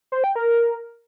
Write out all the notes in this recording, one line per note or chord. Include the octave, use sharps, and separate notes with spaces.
C5
G5
A#4